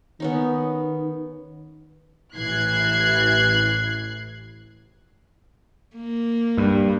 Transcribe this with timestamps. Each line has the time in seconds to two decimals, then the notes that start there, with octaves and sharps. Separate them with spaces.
0.20 D#3 B3 C#4 D#4
2.35 A1 E3 F#6 G#6 C7
5.96 A#3
6.57 G2